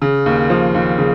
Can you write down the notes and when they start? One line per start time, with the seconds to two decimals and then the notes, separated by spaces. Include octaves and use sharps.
0.02 C#3
0.26 D#2
0.50 F3
0.75 D#2
0.98 C#3